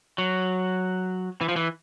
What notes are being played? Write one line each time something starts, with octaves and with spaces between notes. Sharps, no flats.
F#3
E3
F3
E3